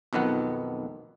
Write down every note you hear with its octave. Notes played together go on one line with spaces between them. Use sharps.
B1 F2 D#3 B3 F#5